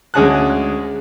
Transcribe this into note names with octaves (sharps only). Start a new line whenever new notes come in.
D2 G#3 C#4 G#4 A5 F#6